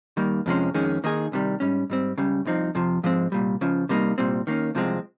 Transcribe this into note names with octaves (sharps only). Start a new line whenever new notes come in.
D#2 D#3 G3 A#3
F2 C3 F3 G#3 C#4
F2 D#3 G#3 C#4 G#4
D#3 A#3 D#4 G#4
C2 C3 D#3 G3
G#2 G3 C#4
G#2 G3 C4
C#2 C#3 G3
C2 C3 F3 C4 D#4
F2 C3 F3
G#2 F3 G#3 C4
C2 A#2 G3
C#2 C#3 F3
C3 G3 A#3 D#4
C2 A#2 G3 C4
D#3 A#3 C#4
C2 C3 F3 G#3 C4